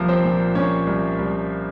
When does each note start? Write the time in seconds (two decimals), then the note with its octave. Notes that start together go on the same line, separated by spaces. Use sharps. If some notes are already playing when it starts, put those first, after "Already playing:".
Already playing: C2 F3 A#3 A#4
0.08 C4 C5
0.24 A#2
0.55 A#2 C#4 C#5
0.87 C2
1.19 C2